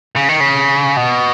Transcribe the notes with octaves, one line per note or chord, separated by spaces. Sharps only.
C#3
D#3
C#3
B2